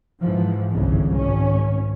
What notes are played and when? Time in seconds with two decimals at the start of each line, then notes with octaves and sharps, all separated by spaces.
0.21 G#2 E3 F3
0.70 G1 C2 C#3 E3
1.12 G#1 C#4